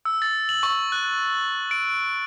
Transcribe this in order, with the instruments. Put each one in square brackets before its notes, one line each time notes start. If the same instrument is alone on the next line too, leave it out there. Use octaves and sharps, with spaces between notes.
[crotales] E6
A6
F#7
C#6
F#6
D7